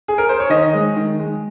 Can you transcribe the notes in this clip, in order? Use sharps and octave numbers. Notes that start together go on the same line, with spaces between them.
G#4
A#4
C5
C#5
D#3 D#5
G#3
D#3
G#3